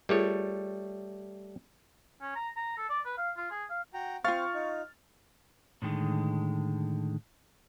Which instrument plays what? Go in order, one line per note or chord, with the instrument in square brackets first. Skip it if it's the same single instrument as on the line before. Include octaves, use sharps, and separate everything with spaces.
[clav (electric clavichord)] G3 A3 C#5 [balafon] F4 G#4 A#4
[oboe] C#4
A#5
A#5
A4
D5
B4
F5
F4
G#4
F5
[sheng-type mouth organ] F#4 G5 A#5
[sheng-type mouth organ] C4 [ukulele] F4 F5 [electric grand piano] C#6 F6 A6
[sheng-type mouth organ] D#4
[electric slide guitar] A2 D3 D#3 G#3